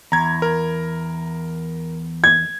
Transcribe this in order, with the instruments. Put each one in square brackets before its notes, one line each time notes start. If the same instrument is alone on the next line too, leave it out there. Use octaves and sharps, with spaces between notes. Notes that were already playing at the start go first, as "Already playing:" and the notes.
[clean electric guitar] E2 [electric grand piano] A#5 G#6
[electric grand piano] A#4
[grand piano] G#6